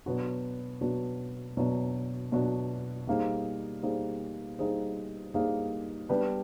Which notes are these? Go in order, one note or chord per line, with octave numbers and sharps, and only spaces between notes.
B2 F#3 B3 D4 F#4
B2 F#3 B3 D4 F#4
B2 F#3 B3 D4 F#4
B2 F#3 B3 D4 F#4
G3 A#3 D#4 G#4 C5
G3 A#3 D#4 G#4 C5
G3 A#3 D#4 G#4 C5
G3 A#3 D#4 G#4 C5
G3 B3 D4 G4 B4